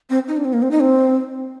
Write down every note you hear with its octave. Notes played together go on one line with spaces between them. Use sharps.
C4
D#4
D4
C4
A#3
C4
D#4
C4